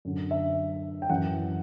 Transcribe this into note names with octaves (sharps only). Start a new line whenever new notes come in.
F#2 D3
E5
G5
F#2 E3 F#5